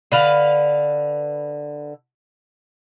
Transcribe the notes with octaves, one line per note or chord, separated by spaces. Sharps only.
D3 B4 F5